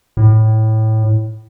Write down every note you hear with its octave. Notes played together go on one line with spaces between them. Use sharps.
A2